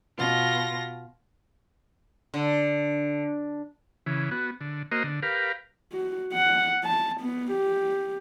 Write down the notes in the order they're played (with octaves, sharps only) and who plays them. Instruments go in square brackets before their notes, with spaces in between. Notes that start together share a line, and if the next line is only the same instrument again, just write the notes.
[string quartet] B2 F4 A#6
[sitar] D3
[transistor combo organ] C#3 E3
B3 F#4
D3
A#3 F#4 A#4 C5 D#5
D3
G4 A#4 B4 F5
[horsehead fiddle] F#4
F#5
A5
B3
G4